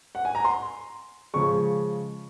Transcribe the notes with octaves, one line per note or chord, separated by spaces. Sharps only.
F#5
G#5
A#5
C6
C#3 F3 G#3 C#6